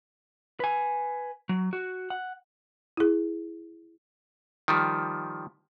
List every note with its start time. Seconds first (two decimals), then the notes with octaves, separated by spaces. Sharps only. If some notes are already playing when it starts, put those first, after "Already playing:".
0.60 B4 G#5
1.49 F#3
1.73 F#4
2.10 F#5
2.97 E4 G#4
4.68 D#3 F3 G3